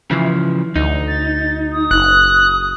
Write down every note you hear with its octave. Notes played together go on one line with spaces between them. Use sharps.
C#3 E3 F3
D2 D#4
A6
D#6
F#1 F#6